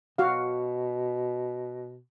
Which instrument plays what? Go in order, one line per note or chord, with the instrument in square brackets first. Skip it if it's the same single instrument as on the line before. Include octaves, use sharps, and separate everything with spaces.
[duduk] B2 [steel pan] F#4 F5